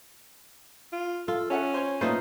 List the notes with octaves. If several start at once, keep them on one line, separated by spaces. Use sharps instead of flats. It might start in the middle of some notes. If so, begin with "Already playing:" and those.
F4
F4 A4
C#4 A4 E5 F#5
C5 C#5
A#2 A3 B3 D#4 F4 C5